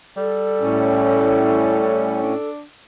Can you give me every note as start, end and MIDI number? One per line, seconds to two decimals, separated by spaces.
0.17 2.21 55
0.17 2.49 69
0.61 2.33 45
0.61 2.33 61
2.23 2.64 62